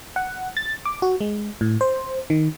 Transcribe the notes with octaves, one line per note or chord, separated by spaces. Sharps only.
F#5
A6
D6
F#4
G#3
A2
C5
D#3